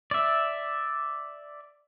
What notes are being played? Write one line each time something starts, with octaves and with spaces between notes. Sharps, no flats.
D5 E5